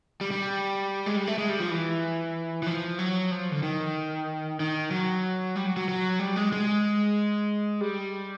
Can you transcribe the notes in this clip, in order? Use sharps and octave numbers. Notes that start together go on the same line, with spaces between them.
G3
G3
G#3
G3
A3
G#3
G3
F3
E3
E3
F3
F#3
F3
D3
D#3
D#3
F#3
G3
F#3
F#3
F#3
G3
G#3
G#3
G3